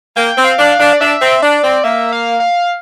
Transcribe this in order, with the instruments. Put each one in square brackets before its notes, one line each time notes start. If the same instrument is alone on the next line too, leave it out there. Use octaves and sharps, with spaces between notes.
[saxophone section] A#3 [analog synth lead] G5
[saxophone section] C4
[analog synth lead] F5
[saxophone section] D4
[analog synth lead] F5
[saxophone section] D4
[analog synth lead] D5
[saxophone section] D4 [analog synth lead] E5
[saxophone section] C4
[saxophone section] D4 [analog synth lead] D5
[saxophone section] C4
[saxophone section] A#3 [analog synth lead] E5
[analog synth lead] F5
F5